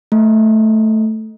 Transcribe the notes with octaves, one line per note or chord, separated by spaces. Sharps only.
A3